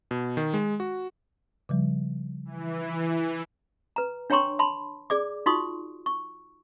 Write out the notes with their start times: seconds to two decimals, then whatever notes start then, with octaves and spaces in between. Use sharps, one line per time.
0.11 B2
0.37 D#3
0.54 G#3
0.80 F#4
1.69 C#3 F3 G3
2.45 E3
3.96 B4 A#5
4.30 D4 C#5 G5 A#5 C6 C#6
4.59 A5 B5 C6
5.10 G#4 D5 D6
5.46 D#4 F4 F#4 C6 C#6 D#6
6.06 C#6